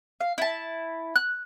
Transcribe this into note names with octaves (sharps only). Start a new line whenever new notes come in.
F5
E4 A5
F#6